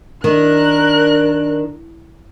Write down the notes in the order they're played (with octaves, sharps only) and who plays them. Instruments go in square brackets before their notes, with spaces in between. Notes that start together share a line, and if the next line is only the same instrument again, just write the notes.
[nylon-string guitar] D#3 [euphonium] D4 [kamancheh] A#4 F#6